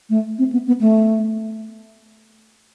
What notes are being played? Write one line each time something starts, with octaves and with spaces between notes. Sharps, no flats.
A3
C4
B3
B3
A3